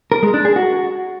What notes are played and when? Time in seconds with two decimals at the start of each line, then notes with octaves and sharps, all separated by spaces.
0.12 A#4
0.23 G#3
0.34 D4
0.45 G#4
0.56 F#4